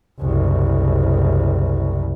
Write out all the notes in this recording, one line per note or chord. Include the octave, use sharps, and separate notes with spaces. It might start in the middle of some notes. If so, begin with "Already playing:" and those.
F#1 C2